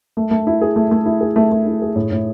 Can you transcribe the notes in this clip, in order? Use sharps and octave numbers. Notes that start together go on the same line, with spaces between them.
A3
A3
E4
G#4
A3
A3
E4
G#4
A3
A3
E4
G#4
A2
A2